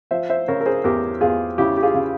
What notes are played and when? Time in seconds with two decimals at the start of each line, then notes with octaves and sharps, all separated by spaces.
0.11 F3 C5 E5
0.30 C5 E5
0.48 C#3 A#4 C#5
0.61 A#4
0.66 G#4 C5
0.84 E2 G4 A#4
1.21 E2 F4 G#4
1.58 C#3 E4 G4
1.77 G4
1.82 F4 G#4
1.94 C#3